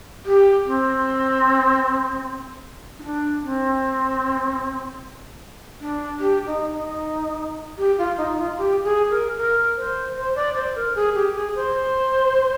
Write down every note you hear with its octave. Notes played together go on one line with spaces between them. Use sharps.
G4
C4
D#4
D4
C4
D4
G4
D#4
D#4
G4
F4
D#4
F4
G4
G#4
A#4
A#4
C5
C5
D5
C5
A#4
G#4
G4
G#4
C5